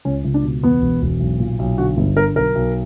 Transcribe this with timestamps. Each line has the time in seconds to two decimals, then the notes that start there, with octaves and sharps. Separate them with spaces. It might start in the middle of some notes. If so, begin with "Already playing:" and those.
0.05 C#2 C#4
0.24 C#2
0.34 D4
0.43 B2
0.63 E2 B3
0.82 E1
1.02 E1
1.20 B1
1.40 A#2
1.59 B1
1.78 D3 F#4
1.97 G1
2.16 D3 A#4
2.35 B1 A#4
2.55 B1